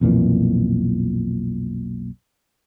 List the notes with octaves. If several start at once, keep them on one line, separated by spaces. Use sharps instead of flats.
B1 F2 A#2 E3